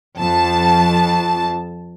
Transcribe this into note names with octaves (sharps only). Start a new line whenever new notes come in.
F2 A5